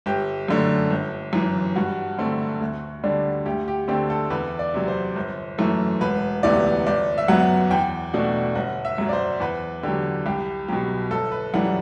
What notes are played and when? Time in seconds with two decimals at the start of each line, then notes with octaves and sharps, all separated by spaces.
0.06 G1 G4
0.48 F#2 D3 A3
0.90 G1
1.33 F#2 E3
1.76 G2 F#4
2.18 D3 A3 C4
2.60 D2
3.04 D3 G3 D4
3.46 D2 G4
3.68 G4
3.88 D3 A3 C4 G4
4.10 A4
4.30 E2 B4
4.59 D5
4.74 C3 F#3
4.88 C5
5.16 G1
5.58 F#2 E3 A3
6.01 E1 B4
6.43 D2 C3 E3 B3 D5
6.86 G1 D5
7.18 E5
7.28 F#2 F#3 B3 F#5
7.71 E2 G5
8.13 B2 A3 D4 F#5
8.55 G1 F#5
8.85 E5
8.98 F#2 F#3
9.09 D5
9.13 C5
9.40 E2 B4
9.83 D3 F#3 G4
10.26 C2 G4
10.68 B2 F#3 G4
11.10 G1 A4
11.32 B4
11.54 F#2 E3 G3 F#5